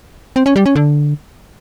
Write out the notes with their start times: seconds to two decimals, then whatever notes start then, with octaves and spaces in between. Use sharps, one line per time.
0.36 C4
0.46 C#4
0.56 G3
0.66 C#4
0.75 D3